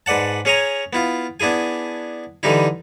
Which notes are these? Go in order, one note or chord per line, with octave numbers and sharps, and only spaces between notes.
G#2 B4 D5 F#5 A5
C#4 G#4 C#5 G#5 A#5
B3 E4 F4
B3 D4 E4 G#4 G#5
D3 E3 G3 D#4 E4